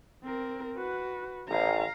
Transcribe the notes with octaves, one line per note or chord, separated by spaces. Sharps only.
C4 A#4
F#4 B4
A1 F5 A#5